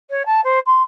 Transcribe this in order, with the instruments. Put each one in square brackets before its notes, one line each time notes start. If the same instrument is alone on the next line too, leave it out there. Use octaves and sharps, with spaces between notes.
[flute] C#5
A5
C5
C6